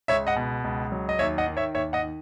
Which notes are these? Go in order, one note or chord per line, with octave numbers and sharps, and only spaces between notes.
C#2 C#5 E5
D#5 F#5
B2
C#2
F#3
D#5
D#2 C#5 E5
D#5 F#5
D#3
C#5 E5
D#2 C#5 E5
D#5 F#5
D#3